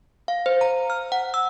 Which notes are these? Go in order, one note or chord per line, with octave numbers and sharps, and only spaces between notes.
F5
C5
A#5
F6
F#5
E6